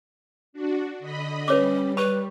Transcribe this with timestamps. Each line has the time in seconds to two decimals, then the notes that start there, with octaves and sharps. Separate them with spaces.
0.53 D4 F#4
0.99 D3 D#5 B5
1.48 G3 C#4 B4 C#5 D6
1.97 B4 B5 C#6